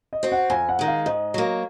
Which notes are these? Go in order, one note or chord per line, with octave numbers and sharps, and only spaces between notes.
D#5
C4 F#4
F#5
F2 G#5
F#5
D#3 G#3
F5
G#2 D#5
F#3 A#3